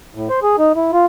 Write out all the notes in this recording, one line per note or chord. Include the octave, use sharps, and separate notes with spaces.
A2
C5
G#4
D#4
E4
F4